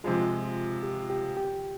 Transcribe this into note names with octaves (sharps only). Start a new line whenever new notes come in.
C3 F3 G#3 F4
G4
G4
G4